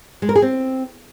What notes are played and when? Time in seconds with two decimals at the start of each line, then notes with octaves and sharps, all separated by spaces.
0.22 G#3
0.29 A#4
0.36 G#4
0.42 C4